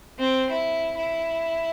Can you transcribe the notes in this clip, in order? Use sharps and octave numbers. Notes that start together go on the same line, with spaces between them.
C4
E4
E4